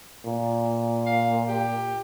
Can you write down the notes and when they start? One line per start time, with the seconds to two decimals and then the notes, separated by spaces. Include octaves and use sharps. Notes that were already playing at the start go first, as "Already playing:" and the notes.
0.24 A#2
1.06 F5
1.48 G4